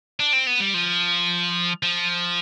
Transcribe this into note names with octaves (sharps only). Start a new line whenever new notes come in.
D4
C4
B3
G3
F3
F3